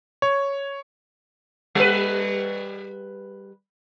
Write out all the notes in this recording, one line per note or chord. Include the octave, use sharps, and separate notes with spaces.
C#5
G3 B4